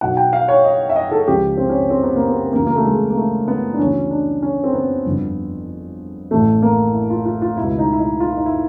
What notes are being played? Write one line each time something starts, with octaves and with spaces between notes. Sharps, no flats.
B1 B2 F#5
G5
F5
C#5
D#5
E5
D#5
A4
C#2 C#3 F3 G4
C4
C#4
C4
B3
A#3
B3
B3
D2 C#3 E3 A#3
A#3
A3
G#3
A#3
A3
B3
D4
D2 C#3 E3 C#4
D4
C#4
C4
B3
G1 F2 D3 F3
A1 A2 E3 A3
A#3
E4
F4
F4
F4
C#2 B2 E4
D#4
E4
D#4
F4
E4
D#4
E4